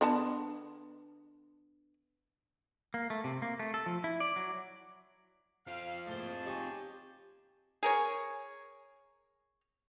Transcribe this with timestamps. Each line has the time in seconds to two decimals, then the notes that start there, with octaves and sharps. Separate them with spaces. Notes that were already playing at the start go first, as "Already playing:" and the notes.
0.01 D3 B3 A5
2.94 A#3
3.10 A3
3.24 C3
3.42 A#3
3.59 A3
3.74 A4
3.86 F3
4.04 E4
4.20 D5
4.36 F#3
5.67 C4 F4 F5
6.07 A2 A#3 G#4 C5 A5
6.45 D#4 G4 C#5 G#5
7.83 G#4 A#4 C#5